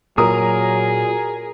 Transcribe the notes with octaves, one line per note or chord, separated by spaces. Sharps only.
A#2 F#3 G#4 A#4 A#5 D#6